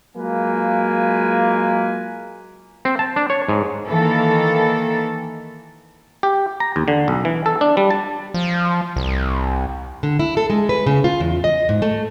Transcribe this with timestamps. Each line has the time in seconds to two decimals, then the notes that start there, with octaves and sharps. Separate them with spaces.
0.16 F#3 G#3 A#3 F4 B4 G#5
2.85 C4
2.99 A5
3.16 D4
3.30 C#5
3.48 G#2
3.85 D#3 E3 A#3 A4
6.23 G4
6.60 A#5
6.76 D#2
6.88 D3
7.08 B1
7.25 E3
7.46 A4
7.61 D4
7.77 G3
7.91 A5
8.34 F3
8.96 C2
10.03 D3
10.19 E4
10.37 A4
10.50 G#3
10.69 B4
10.87 C#3
11.04 F4
11.20 E2
11.44 D#5
11.69 G#2
11.82 A3